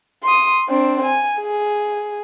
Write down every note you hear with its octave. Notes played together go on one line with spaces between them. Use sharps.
C6 D#6
C4 D4
G#5
G#4